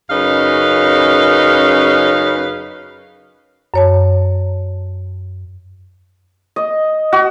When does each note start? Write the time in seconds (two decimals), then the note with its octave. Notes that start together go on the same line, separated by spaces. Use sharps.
0.10 F#2 C#3 C#4 D#4 B4 F5
3.74 F#2 C#5 A5
6.56 D#5
7.13 F#4